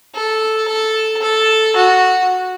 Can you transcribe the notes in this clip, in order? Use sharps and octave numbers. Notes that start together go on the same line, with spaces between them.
A4
A4
A4
F#4